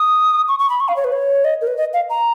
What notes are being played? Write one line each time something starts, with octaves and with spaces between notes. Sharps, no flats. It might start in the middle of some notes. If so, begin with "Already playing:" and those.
Already playing: D#6
C#6
C#6
B5
C#6
F5
C#5
B4
C#5
D#5
A#4
B4
D#5
F5
A#5